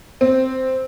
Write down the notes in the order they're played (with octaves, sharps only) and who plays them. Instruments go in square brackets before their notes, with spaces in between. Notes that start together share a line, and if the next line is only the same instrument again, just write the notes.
[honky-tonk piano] C4